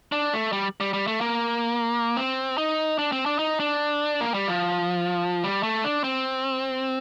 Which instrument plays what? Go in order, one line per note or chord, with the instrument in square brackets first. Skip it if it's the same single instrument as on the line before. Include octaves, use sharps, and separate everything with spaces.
[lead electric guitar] D4
A3
G3
G3
G3
A3
A#3
C4
D#4
D4
C4
D4
D#4
D4
A#3
G3
F3
G3
A3
D4
C4